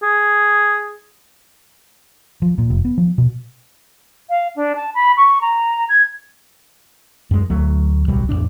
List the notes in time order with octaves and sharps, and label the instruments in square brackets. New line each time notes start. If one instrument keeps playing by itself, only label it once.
[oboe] G#4
[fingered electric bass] F3
A#2
F1
B3
F3
B2
[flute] F5
D4
A5
B5
C#6
A#5
G#6
[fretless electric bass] F#2 G#3
D2 F#3 A3
D1 B1 F#3 G3
A1 E2 A#2 D4